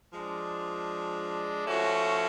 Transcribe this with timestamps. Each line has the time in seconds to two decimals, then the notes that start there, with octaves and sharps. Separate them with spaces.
0.13 F3 G#3 D4
1.67 F3 A3 C#4 F#4